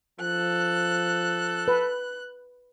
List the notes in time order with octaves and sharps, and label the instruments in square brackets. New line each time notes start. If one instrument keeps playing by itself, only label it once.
[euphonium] F3 [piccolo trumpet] A4 [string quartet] F#6
[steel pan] B4